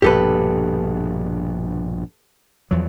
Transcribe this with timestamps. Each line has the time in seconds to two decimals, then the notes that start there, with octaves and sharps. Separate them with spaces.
0.02 A#1 G2 B2 G4 A4 B4
2.71 E2 F3 F#3